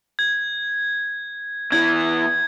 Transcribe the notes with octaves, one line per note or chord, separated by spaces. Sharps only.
G#6
E2 E3 G#6